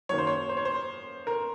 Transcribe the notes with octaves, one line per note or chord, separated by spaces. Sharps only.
F#2 D#3 A#3 C#5
C5
C#5
C5
C#5
C5
A#4